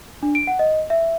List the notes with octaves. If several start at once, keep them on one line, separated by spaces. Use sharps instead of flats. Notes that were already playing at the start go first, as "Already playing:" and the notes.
D4
D7
F#5
D#5
E5